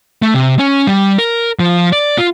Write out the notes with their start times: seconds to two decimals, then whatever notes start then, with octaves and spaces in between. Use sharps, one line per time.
0.22 A3
0.34 C3
0.59 C#4
0.87 G3
1.18 A#4
1.59 F3
1.92 D5
2.18 F4